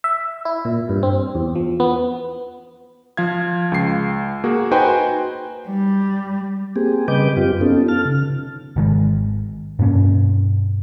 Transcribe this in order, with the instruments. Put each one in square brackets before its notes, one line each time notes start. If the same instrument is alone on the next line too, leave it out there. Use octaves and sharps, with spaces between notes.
[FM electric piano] E5
E4
A#2
G2
C4
E2
F3
B3
[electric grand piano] F3 F5 G#6
C#2 C7
A#3 F#4 G#4
D#4 F#4 B4 C5 G5 G#5
[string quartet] G3
[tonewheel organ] A#3 C4 G4 G#4
C#3 G3 B4 D#5 D6 G6
F#2 C4 F4 G4
B3 C#4 D#4 F4 A4
A5 F6
C#3
[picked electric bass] G#1 D#3 G#3
G2 B2 A#3 C#4